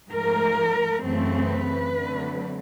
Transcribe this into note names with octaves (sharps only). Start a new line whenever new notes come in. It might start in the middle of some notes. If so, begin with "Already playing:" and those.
G#2 F3 A3 A#4
F#2 C#3 E3 A3 C4
B4
D3 F#3 A3 C4